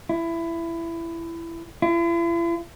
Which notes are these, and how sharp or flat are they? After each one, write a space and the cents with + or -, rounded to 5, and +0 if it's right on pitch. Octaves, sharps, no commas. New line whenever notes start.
E4 +20
E4 +45